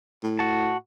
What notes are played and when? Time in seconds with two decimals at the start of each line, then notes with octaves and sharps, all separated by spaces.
0.23 A2
0.39 F#4 A5